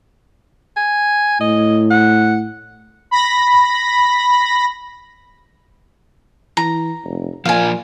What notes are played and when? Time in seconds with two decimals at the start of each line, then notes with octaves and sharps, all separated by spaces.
0.77 G#5
1.41 A2 D#5
1.90 F#5
3.11 B5 A#6
6.57 E3 A#5
7.04 F1
7.45 A#2 F3 A#3 D5 F5 G#5